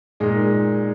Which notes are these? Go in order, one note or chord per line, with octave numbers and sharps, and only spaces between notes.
A#2 G#3 D#4